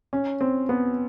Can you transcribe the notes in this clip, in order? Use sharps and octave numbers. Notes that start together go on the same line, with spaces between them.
C#4
C4
B3